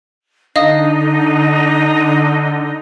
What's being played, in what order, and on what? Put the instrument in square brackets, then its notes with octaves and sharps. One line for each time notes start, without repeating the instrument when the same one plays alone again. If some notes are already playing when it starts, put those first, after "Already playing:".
[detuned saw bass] D3 [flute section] D4 D#4 [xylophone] D#5 F5 D#6